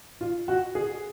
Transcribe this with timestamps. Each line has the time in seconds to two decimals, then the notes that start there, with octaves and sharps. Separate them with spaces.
0.21 F4
0.48 F#4
0.75 G#4